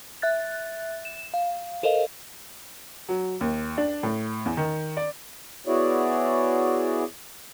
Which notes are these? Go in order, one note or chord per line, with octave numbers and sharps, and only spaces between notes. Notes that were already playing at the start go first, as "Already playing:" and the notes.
E5 F#6 A6
E7
F5
A4 A#4 C5 D#5 F5
F#3
D#2
D4
A2
E2
D#3
D5
B3 E4 F#4 G#4 C#5 D5